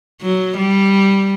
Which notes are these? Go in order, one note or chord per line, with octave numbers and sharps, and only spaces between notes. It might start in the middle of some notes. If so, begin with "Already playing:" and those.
F#3
G3